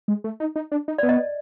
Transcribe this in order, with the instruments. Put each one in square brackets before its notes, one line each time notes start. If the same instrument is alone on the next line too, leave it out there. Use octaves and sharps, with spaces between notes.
[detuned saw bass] G#3
A3
D#4
D#4
D4
D#4
[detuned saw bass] B3 [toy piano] D5
[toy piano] D#5